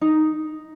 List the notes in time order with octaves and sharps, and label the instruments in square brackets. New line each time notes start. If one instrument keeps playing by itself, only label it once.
[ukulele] D#4